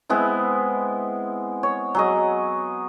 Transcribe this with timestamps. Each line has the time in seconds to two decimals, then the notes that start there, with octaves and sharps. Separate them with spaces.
0.09 G#3 B3 C4 E4
1.63 C#5
1.95 F#3 G#4 D#5